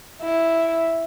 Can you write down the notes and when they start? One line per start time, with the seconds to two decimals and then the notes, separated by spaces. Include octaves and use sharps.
0.22 E4